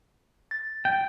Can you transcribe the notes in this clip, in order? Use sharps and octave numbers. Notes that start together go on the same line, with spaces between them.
A6
G5